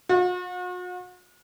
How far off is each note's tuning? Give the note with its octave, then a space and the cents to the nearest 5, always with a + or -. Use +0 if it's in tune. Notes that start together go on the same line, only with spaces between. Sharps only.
F#4 -45